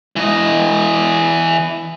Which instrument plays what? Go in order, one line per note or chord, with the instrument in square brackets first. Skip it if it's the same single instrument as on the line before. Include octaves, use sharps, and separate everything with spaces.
[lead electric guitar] E3 D#5